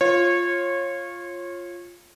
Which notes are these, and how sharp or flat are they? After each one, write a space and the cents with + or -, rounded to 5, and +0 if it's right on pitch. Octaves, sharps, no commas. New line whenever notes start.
F4 +0 C#5 -25